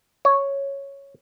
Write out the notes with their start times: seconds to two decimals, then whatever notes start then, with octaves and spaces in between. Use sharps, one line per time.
0.25 C#5